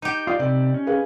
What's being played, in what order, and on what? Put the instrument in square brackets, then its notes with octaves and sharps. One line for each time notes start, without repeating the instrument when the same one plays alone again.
[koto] D#4 G4
[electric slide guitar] F4 [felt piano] D5 D#6
[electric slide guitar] C3 [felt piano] D5
[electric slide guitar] C#4
[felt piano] G#4 B4 F5